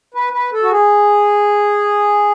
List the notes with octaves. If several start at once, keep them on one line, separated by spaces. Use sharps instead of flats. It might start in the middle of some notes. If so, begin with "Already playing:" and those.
B4
B4
A4
F#4
G#4